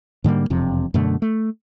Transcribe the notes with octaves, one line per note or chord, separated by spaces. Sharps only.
G#2 D3 G3 A#3
E1 F2 C3
F#2 B2 D3 A3
A3